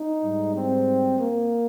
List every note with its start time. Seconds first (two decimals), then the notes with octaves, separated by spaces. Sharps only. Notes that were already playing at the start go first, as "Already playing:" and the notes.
Already playing: D#4
0.22 G#2 G3
0.53 C4
1.17 A#3